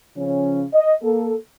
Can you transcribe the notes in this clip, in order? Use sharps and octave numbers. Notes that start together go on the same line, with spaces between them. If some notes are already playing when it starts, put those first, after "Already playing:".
C#3 F3 C#4
D#5
A#3 A4